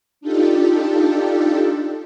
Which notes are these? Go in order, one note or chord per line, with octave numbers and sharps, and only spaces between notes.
D4 D#4 F4 G4 A4